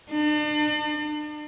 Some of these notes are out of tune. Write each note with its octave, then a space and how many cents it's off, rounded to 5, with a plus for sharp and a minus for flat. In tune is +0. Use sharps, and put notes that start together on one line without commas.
D4 +40